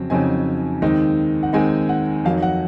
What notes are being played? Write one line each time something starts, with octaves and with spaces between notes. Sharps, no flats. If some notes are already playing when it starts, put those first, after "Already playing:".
Already playing: F2 C#3 F#3 C4
F2 C#3 F#3 C4 D#4 G#5
D#2 D#3 G#3 C4 D#4
F#5
D#2 D#3 G#3 C4 D#4 G#5
F#5
F2 D#3 F#3 F5
F#5